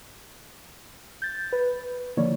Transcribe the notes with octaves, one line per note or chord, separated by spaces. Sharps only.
G6 A6
B4
D3 D#3 F3 A#3 C#5 D5